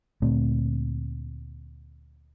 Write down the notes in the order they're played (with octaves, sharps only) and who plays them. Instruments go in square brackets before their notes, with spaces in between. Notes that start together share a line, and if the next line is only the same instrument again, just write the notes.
[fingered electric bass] D2 A#2 A3 C4